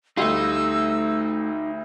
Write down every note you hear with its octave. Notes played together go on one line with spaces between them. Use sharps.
D2 G3 A3 D#4 F4 E6